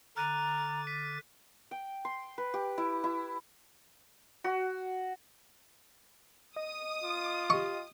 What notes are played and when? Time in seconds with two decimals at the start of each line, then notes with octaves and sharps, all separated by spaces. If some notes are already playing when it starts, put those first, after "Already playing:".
0.17 D3 A#5 D6 F6 F#6 A6 D#7
0.87 B6 D#7
1.71 G5
2.05 C6
2.38 B4
2.54 G4
2.78 E4
3.04 E4
4.44 F#4
6.56 D#5 D#6
7.03 F4
7.50 G4 D#5 C#6